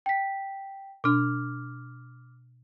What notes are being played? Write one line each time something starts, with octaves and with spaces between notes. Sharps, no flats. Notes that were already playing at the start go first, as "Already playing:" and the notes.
G5 B6
B2 D4 D6 F6